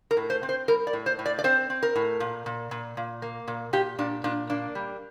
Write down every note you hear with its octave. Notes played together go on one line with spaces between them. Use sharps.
A#4
A2
C5
C4
C5
G3 A#4
D5
A2
C5
A2
D5
D5
C4 C5
C4
A#4
A2
A#2
A#2
A#2
A#2
A#3
A#2
A#2 G4
A#2 D4
A#2 D4
A#3 D4
G3